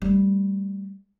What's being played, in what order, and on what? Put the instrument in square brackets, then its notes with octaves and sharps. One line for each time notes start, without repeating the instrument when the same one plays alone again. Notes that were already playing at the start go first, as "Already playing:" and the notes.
[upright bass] G3 A3